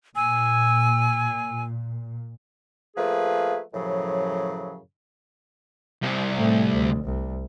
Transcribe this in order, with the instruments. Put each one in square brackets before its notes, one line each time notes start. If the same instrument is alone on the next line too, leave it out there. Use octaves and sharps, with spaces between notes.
[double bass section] A#2 [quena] G#5 [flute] E6
[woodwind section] F3 A3 A#3 G#4 B4
F#2 A2 C#3 F3 F#3
[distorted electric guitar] C2 C3
[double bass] A2 A3
D2
C2